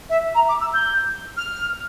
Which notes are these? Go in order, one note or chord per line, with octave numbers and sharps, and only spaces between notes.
E5
A#5
D6
E6
G6
F6